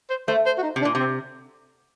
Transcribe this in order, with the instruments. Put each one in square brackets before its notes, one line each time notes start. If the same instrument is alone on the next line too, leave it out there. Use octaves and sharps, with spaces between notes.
[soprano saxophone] C5
[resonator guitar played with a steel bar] A3 [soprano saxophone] C5
[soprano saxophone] C5
F#4
D#4
[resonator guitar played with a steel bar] C3
[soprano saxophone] D4
[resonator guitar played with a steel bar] A#2
[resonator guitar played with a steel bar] C3 [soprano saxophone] C4